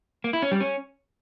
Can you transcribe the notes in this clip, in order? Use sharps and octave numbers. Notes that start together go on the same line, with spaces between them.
A#3
E4
C#4
G3
C#4